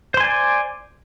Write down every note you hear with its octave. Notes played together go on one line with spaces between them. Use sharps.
C5 D5 G#5 C6